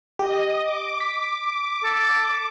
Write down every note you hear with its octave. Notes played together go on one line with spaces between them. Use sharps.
G4 D#5
D6
B6
A4